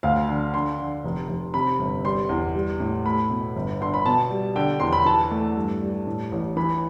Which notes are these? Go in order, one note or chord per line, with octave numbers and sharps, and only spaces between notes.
D2 F5
D3
D3 C6
D3
F1
F1
C3 B5
G1
G3 C6
E2
G3
A2
A3 B5
B2
G1
D3 C6
B5
B2 A5
G3
D3 G5
E2 C6
B5
E3 A5
A3
G2
G3
A2
A1
E3 B5